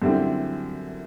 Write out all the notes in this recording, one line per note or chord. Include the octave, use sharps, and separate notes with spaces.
F#2 D3 G3 C4 E4